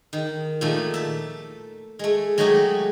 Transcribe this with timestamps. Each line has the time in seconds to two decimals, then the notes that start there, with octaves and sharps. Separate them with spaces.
0.13 D#3
0.61 A#2 D#3 F3 A3 A4
0.94 E5 A5
1.99 G#3 A3
2.38 F#3 G#3 A3 F#4 G4 D#5